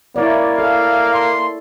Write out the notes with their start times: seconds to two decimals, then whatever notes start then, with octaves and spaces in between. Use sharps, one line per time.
0.16 A#3 E4 C#5 D5
0.59 A4 F5
1.14 C6